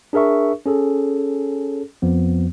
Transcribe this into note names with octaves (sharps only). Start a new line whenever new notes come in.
D4 G#4 A#4 E5 C#6
C#4 G#4 A4
F2 F3 B3